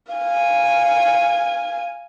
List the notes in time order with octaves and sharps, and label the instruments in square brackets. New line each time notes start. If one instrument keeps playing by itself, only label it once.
[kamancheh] F5 G#5